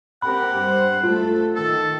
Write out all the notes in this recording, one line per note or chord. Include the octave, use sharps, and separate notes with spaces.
C4 G4 A#4 F#5 B5
G2 C5
A3 F4 A4
D#3 A4